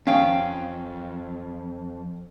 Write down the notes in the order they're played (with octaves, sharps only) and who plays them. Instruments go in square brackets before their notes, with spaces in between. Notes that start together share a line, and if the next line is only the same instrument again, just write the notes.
[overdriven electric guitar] F2 [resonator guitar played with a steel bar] D#3 F5 G5 [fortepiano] C#4